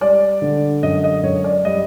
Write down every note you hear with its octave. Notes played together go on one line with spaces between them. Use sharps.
G3 D5
D3
F#2 D#5
D#5
F#2 C#5
D5
G3 D#5